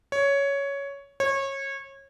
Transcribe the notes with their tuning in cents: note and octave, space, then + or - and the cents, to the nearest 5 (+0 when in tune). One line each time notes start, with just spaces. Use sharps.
C#5 +10
C#5 -25